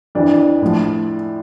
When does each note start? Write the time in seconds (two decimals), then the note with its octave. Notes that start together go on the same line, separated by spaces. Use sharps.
0.15 F2 E3 D4
0.62 A2 F3